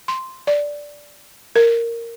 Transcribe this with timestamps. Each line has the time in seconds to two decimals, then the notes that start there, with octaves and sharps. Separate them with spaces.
0.08 C6
0.47 D5
1.56 A#4